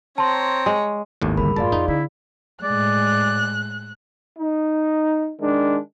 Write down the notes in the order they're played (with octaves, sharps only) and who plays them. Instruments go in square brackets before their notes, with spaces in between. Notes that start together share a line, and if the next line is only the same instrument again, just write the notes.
[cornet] C4 [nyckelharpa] C#5 A#5 [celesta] A5 C6
[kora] G#3
[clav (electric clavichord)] G#1 D#2 A2
[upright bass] D3 G3 [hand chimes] G#4 A#4 B5
[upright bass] F#2 A2 [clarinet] F4 [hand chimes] G#4 D5 F5 [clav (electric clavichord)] A5
[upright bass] F2 [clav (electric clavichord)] D#4
[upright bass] D3 [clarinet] E4
[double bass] A2 G#3 [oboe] D5 [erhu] F#6
[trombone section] D#4
D#3 G#3 D4